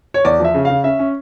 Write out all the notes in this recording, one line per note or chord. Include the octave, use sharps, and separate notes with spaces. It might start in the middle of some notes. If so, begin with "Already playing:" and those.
C#5
E2 D5
F3
E5
C#3
C#3 F5
C#4 E5
C#4